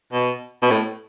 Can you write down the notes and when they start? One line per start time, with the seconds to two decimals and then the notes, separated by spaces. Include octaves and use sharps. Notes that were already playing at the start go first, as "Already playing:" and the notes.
0.13 B2
0.62 B2
0.71 A2